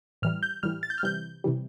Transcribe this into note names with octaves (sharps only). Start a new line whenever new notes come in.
A2 E3 G3 F6
G6
A2 E3 G3 F6
A6
G6
F6
C3 E3 G3 G6
C3 E3 G3